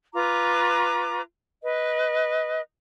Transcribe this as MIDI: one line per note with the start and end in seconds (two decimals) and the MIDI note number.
0.14 1.21 65
0.14 1.21 71
0.14 1.21 82
0.14 1.21 86
1.63 2.60 71
1.63 2.60 75